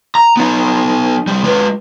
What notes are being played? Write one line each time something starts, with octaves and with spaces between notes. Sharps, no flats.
A#5
B3 D#4
C2 G3
G#3 B4